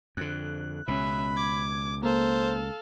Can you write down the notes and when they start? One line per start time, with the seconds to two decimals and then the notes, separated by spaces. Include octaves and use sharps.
0.17 F2 D3 F#6
0.88 C#2 B2 C#4 E5 B5
1.37 D6 G#6
2.03 A#3 A4 C5 F5